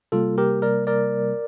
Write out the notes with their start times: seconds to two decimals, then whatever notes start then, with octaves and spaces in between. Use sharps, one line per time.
0.12 C3 G3 A#3 F4 A4
0.38 G4 A#4
0.62 A#4 D5
0.87 A#4 D5